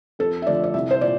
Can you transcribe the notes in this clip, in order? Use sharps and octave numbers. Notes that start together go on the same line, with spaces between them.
F2 A4
E5
D3 F3 A3 D5
D5
C2 E5
C5
A#2 D5